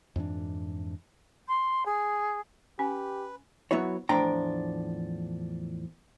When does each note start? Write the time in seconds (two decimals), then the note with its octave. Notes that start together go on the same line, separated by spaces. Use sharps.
0.16 F2 G#2 E3 D4
1.47 C6
1.85 G#4
2.79 C#4 G4 B4 G#5
3.71 F#3 B3 E4 F#4 C#5
4.09 E2 A2 F3 D4 G5 A#5